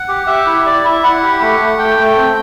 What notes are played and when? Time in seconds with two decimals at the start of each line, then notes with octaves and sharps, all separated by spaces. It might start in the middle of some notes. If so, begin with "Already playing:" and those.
Already playing: F#5
0.08 G4
0.27 G4 E5
0.47 E4
0.66 E4 D5
0.84 E4 E5
1.03 E4 F#5
1.23 G4
1.41 A3
1.60 A3
1.79 A3 G5
1.99 A3
2.17 C4